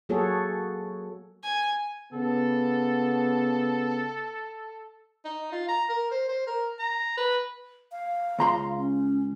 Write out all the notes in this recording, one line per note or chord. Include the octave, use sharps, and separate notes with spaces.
F#3 A#3 F#4 G#4 A4 C#5
G#5
C#3 B3 A4
D#4
F4
A#5
A#4
C5
C5
A#4
A#5
B4
F5
C#2 A#5 C6
C#4